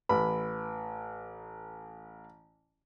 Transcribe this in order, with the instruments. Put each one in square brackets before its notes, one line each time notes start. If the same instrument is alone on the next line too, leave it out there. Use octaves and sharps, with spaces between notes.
[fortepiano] A1 B5 [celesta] B4